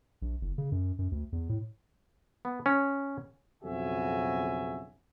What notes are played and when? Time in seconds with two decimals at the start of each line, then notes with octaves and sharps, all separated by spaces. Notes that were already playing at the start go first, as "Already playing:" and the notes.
0.22 A#1
0.41 F#1
0.58 C#3
0.72 F#2
0.99 F#2
1.12 D2
1.32 E2
1.49 A2
2.45 B3
2.66 C#4
3.62 B1 F2 C#3 F#4 E5 G#5